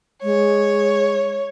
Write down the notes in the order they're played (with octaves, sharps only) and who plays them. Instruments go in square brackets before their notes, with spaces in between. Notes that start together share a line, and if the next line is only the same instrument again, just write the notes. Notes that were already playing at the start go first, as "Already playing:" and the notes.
[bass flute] G#3 [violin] C#5